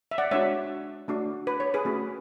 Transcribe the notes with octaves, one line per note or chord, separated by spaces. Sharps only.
E5
D5 F#5
G#3 D4 F#4 C#5 E5
A3 D4 F#4
B4
C#5
G#4 B4
A3 C#4 F#4